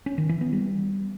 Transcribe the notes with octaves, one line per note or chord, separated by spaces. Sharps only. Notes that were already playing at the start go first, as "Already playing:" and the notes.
C#4
D#3
E3
B3
G3